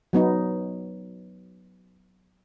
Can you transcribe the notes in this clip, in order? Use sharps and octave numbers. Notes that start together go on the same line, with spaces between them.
F#3 B3 D#4